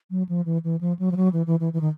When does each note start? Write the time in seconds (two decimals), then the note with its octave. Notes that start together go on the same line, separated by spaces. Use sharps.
0.11 F#3
0.29 F3
0.46 E3
0.64 E3
0.81 F3
0.99 F#3
1.12 F3
1.16 F#3
1.33 E3
1.47 E3
1.60 E3
1.73 E3
1.81 D#3